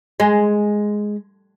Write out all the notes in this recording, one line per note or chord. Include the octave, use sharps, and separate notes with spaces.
G#3